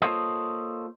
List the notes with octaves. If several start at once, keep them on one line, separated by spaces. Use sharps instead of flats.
A#3 F4 A4 C5 C#5 D#5